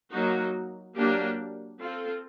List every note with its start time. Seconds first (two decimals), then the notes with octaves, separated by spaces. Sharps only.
0.11 F#3 A#3 D#4 F#4
0.94 F#3 A#3 D4 G4
1.78 C4 F4 A4